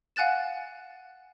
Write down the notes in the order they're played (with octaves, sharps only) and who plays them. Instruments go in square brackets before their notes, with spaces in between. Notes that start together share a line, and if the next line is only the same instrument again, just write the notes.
[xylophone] F5 F#5 G#5 F#6 A6 E7